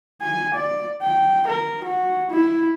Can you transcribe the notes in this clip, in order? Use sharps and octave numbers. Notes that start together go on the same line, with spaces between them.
G#5
D5
G5
A#4
F#4
E4